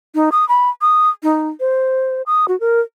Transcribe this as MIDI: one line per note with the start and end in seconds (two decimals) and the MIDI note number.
0.15 0.30 63
0.32 0.47 87
0.49 0.69 83
0.82 1.09 87
1.23 1.49 63
1.60 2.22 72
2.26 2.46 87
2.48 2.58 66
2.60 2.81 70